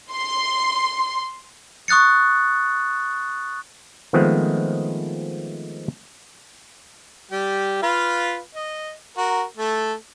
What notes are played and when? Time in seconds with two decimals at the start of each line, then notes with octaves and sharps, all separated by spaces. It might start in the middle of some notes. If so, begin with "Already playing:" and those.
0.12 C6
1.88 C#6 D#6 F#6 A6 C#7
4.13 D#3 F3 G#3 A3 B3 C4
7.31 G3 G4
7.83 F4 B4 F5
8.55 D#5
9.18 F#4 A#4
9.57 A3 A4